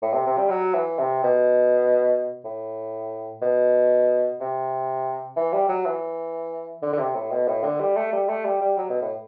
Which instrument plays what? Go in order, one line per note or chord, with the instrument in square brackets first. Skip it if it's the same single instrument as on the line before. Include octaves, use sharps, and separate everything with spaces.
[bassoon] A2
C3
C3
G3
F#3
E3
C3
B2
A2
B2
C3
E3
G3
F#3
E3
D3
D3
C3
A2
B2
A2
D3
G3
A3
G3
A3
G3
G3
F#3
B2
A2